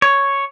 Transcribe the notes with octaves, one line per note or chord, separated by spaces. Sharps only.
C#5